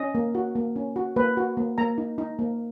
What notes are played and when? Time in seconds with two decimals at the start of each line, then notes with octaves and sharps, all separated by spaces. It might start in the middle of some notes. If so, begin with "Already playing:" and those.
Already playing: C#4 D#5
0.15 A#3
0.35 F#4
0.56 A#3
0.76 C#4
0.96 F#4
1.16 A#3 B4
1.37 F#4
1.57 A#3
1.78 A#3 A#5
1.98 D#4
2.18 D#4
2.39 A#3